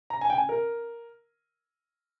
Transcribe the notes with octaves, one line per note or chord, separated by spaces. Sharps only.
A#5
G#5
G5
G#5
A#4